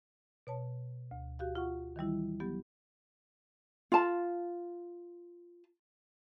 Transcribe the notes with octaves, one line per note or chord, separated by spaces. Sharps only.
B2 C#5 A5
D2
F#4 G4 F5
F4 F#5 C#6
D#3 E3 G3 E4
F#3 B3 G4
F4 A5